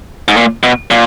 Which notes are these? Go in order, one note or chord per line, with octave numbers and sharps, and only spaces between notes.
G#2
A#2
B2
A#2